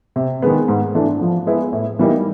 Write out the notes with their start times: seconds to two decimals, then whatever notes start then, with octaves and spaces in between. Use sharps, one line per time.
0.16 C3
0.42 D#3 G#3 B3
0.68 G#2
0.95 E3 A3 D4
1.21 F3
1.47 G#3 B3 E4
1.73 A2
1.99 E3 G3 A#3 D#4